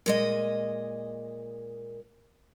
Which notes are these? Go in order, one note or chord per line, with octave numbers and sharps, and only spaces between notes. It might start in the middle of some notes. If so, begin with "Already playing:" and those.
A#2 G#3 D#5